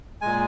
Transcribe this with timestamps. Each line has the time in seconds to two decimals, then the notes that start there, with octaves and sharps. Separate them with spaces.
0.21 A#2 G#3 G#5